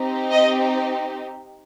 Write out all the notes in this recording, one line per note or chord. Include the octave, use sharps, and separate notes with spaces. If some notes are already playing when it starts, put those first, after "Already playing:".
Already playing: C4 D#4 G4
D#5